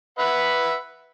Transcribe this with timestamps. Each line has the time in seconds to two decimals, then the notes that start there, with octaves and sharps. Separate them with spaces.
0.19 B4 E5 F#5